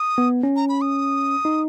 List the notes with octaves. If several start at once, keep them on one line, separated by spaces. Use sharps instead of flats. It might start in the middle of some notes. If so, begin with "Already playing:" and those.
Already playing: D#6
B3
C#4
A#5
B5
D#6
D#4